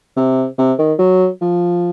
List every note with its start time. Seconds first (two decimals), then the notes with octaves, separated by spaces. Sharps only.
0.17 C3
0.58 C3
0.78 D#3
0.99 F#3
1.41 F3